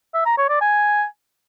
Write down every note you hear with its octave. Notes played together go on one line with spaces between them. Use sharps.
E5
A#5
C#5
D5
G#5